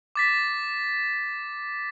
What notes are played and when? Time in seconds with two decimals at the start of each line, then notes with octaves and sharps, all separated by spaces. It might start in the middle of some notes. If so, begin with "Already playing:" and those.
0.15 D6 A6 B6